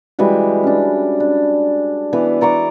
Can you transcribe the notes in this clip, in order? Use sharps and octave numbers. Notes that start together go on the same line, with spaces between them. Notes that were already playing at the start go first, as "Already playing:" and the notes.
E3 G3 G#3 F#4
C#4 D4
D4
E3 B3 D6
D5 A#5 C#6 D6